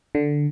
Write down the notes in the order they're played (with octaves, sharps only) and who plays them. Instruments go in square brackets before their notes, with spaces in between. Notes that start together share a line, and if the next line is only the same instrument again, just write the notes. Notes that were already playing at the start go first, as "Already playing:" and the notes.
[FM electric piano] D3